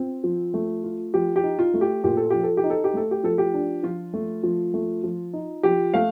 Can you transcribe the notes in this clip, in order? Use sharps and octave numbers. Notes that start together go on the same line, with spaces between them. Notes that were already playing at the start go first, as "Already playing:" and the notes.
Already playing: C4 F4
F3
A3
F4
F3 G4
G4
D#4
F4
A3
G4
A#2 G4
A4
F3 G4
A4
G4
D#4
A4
G4
A3 A4
G4
F3 A4
G4
D4
F3 F4
A3
F3
A3
F3
D#4
F3 G4
A3 F5